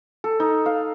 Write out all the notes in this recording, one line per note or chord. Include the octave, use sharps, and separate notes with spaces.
A4
D#4
F5